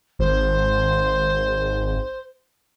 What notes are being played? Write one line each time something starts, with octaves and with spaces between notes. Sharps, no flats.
G#1 C5